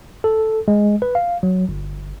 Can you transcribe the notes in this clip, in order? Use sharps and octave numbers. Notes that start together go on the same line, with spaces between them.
A4
G#3
B4
F5
F#3
G1